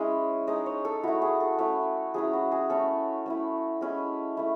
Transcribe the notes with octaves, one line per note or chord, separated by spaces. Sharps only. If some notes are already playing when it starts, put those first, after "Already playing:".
Already playing: G#3 C#4 E4 E5
G#3 D#4 D#5
C#5
A4
A3 E4 F#4
G#4
A4
A3 C#4 E4
F#3 C#4 E4 G#4
F#4
G#4
A3 C#4 E4 A4
A3 C#4 E4
G#3 C#4 E4
A3 E4